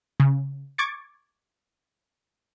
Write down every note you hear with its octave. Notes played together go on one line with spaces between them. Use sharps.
C#3
C#6 D6 G#6 A6 C#7